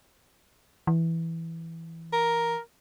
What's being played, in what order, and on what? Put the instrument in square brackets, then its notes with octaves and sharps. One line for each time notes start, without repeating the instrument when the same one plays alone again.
[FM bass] E3
[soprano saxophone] A#4